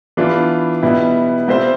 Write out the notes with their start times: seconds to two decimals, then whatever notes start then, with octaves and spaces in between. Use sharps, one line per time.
0.17 E3 B3 D4 F4
0.82 B2 G3 B3 E4
1.48 G3 C4 G4 C5 E5